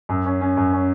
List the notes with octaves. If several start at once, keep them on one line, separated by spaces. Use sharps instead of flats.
F#2
C#4
C#4
F#2
C#4